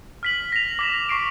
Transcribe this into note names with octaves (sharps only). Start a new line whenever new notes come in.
F6 B6 F#7
A#6 F7
D6 A#6 E7
C#6 C7 D7